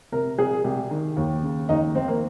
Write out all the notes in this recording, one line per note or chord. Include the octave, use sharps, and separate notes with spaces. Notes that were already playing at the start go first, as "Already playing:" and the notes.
C3 A#4
C2 G#4
C2 G4
D#3
D#2
C#3
D#2 D#4
D#2 C4
A#3